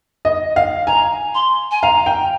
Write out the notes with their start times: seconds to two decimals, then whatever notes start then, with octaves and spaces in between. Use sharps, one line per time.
0.25 D#5
0.56 F5
0.87 G#5 A#5
1.35 C6
1.71 G#5
1.82 F5 A#5
2.06 G5